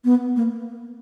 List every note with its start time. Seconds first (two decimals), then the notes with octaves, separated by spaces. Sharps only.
0.05 B3
0.36 A#3